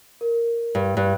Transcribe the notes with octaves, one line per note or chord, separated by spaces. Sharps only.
A#4
G2
G2 F#6